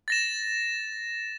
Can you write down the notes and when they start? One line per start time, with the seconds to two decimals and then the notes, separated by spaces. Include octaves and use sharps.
0.08 A6 A#6 E7